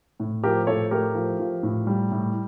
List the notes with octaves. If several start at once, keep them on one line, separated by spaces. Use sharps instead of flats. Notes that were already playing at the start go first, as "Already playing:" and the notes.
A2
F3 G4 A#4
A2 A4 C#5
A3 G4 A#4
F3
F3
A2
G3
A2